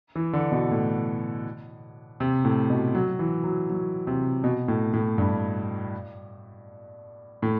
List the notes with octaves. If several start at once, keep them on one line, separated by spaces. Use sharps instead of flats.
E3
D3
B2
A2
C3
A2
B2
F#3
E3
F#3
F#3
C3
B2
A2
A2
G2
A2